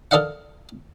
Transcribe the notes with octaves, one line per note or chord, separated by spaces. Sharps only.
A4 A#4 D5 D#5 F5 F#5